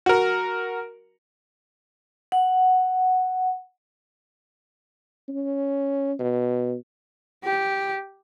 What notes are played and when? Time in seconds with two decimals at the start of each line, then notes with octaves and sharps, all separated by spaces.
0.06 F#4 A#4
2.32 F#5
5.29 C#4
6.19 B2
7.44 G4